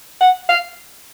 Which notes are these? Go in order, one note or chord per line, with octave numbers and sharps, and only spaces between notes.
F#5
F5